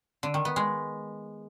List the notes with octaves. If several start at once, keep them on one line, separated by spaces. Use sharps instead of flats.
D3
D#3
B3
G#3